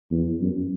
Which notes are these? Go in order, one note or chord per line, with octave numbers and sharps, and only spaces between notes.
E2
F#2